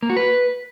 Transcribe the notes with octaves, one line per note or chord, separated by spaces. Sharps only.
A#3
F#4
B4